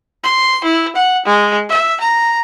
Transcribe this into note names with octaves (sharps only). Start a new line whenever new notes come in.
C6
E4
F#5
G#3
E5
A#5